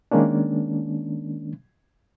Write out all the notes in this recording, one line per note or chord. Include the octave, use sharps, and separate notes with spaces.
D#3 G#3 A#3 C#4 D4